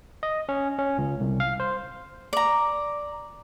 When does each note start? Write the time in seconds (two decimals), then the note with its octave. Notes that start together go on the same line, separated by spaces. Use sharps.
0.23 D#5
0.49 C#4
0.79 C#4
0.98 C#2
1.20 C2
1.40 F5
1.60 C5
2.33 D5 A#5